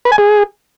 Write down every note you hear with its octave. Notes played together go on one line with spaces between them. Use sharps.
B4
G#5
G#4